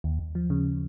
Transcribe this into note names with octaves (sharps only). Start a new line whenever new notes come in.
D#2
D#2
F3
C#3